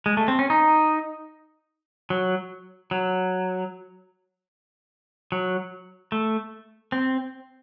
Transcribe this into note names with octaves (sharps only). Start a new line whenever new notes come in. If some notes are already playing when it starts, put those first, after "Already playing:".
G#3
A3
C4
C#4
D#4
F#3
F#3
F#3
A3
C4